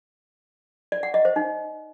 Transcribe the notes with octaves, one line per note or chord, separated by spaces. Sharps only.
D5
F#5
D#5
C5
D#4